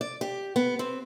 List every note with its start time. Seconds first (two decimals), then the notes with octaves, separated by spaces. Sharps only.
0.01 D5
0.21 G4
0.56 B3
0.79 C4